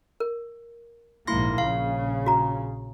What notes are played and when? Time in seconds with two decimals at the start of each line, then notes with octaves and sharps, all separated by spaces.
0.20 A#4
1.27 A#1 G#2 A#3 E4 C6 A#6
1.58 A#1 C#3 F5
2.26 F#4 A#5